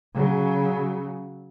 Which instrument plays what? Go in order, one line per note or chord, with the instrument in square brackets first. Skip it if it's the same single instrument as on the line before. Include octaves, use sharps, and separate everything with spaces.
[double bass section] C#3 F#3